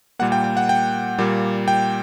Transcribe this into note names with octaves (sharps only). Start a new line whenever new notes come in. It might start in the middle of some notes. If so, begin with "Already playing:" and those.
A#2 G3 A#3 F#5
G5
G5
F#5
G5
A#2 G3 A#3
G5